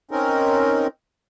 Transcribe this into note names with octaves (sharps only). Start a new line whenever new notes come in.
C4 C#4 D#4 A#4